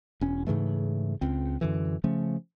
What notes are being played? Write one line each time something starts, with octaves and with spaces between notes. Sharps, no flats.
E1 C#4
G#2 C#3 E3 A3
C#2 C4
F#2 D3 E3
C#3 F3 A3 C#4